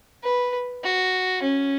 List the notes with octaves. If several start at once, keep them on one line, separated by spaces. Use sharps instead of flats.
B4
F#4
C#4